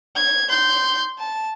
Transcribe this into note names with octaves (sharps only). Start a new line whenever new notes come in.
G#6
C6 G6
A5